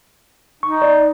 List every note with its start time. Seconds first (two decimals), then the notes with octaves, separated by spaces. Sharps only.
0.63 D#4 C#6
0.82 D5